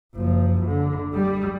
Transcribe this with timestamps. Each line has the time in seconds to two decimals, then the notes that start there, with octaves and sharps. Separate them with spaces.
0.15 F#1 F3
0.65 D3
1.14 G3